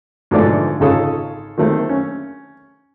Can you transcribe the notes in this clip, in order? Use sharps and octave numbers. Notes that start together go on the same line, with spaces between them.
G#2 B2 D3 F3 A3 D5
G#1 C#3 F4 A4 C#5 D#6
D#3 F#3 A3 A#3 C4
C#4